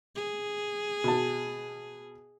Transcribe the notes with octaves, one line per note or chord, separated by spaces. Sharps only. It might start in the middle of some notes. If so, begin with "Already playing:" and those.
G#4
B2 A5